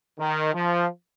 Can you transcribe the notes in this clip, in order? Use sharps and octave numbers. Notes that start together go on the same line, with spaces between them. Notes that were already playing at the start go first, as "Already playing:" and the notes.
D#3
F3